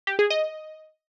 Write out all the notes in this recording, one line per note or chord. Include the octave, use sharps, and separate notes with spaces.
G4
G#4
D#5